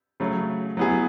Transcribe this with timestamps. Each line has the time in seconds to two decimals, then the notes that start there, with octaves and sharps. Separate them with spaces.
0.20 C#3 F#3 A3
0.77 F#3 B3 E4 G#4